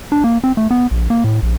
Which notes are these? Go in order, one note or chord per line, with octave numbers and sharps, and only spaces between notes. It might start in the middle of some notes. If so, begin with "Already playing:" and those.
D4
A#3
C4
A3
B3
A#1
A#3
A2
A#1